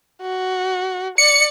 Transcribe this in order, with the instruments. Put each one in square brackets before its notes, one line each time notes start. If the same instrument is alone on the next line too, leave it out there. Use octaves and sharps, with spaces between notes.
[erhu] F#4
[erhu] D5 [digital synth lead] C#7